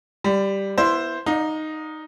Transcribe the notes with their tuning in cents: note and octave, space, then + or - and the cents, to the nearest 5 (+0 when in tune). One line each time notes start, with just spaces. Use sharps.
G3 +0 B5 +40
B3 -15 E4 +10 C5 +0
D#4 +0 D5 +25 F5 +40